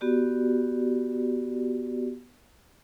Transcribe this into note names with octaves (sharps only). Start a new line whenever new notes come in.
B3 F#4 G4 D5